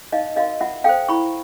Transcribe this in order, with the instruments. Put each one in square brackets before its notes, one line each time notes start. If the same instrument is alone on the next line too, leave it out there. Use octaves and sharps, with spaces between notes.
[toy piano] D#4 D#5 F5
F#4 A#4 D#5 F5
F4 E5 F#5
A4 C5 F5 G5
E4 B5 C#6